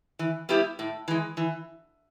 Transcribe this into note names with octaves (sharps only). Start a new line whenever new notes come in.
E3
G3 B3 E4 G4
A2
E3 G#3
E3